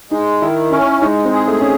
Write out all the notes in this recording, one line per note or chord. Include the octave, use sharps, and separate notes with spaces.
G#3 D#4
D#3 E4
C#4 E4
G#3 D#4
C4
G#4
A3
C#4